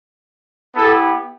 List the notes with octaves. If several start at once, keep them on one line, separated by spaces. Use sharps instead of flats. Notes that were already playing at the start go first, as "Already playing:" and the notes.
B3 E4 G4 A4